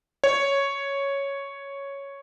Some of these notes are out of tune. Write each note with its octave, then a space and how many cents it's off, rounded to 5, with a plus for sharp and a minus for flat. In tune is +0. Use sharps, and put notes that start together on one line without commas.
C#5 +0